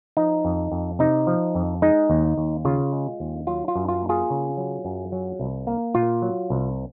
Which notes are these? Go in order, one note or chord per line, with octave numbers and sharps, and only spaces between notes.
F3 D#4
F2
F2
C3 D#4
F3
F2
G#3 D#4
D#2
D#2
C#3 F4
G#3
D#2
F#3 F4
F4
F#2
F4
A#3
F4 G#4
C#3
F#3
F#2
F#3
C2
A#3
A#2 F4
F#3
C2